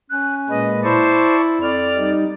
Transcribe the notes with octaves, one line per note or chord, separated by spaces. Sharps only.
C#4 F#6
A#2 G#3 B4 D#5
E4 C5 D5 A5 C#6
F2 D5 F6
G3 D#4